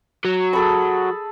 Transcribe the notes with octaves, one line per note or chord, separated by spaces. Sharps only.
F#3
G#4 A4 B5